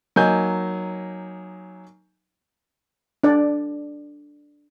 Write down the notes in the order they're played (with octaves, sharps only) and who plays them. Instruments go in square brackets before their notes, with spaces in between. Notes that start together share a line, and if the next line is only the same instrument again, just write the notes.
[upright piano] F#3 A#3 D#4 G#5 G6
[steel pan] D4 D5